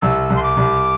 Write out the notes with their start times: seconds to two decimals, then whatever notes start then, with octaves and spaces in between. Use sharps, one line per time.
0.02 C2 E6
0.30 C2
0.36 C6
0.43 D6
0.57 C2